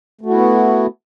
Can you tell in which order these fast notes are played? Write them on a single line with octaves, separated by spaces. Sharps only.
A3 F#4 E4 B3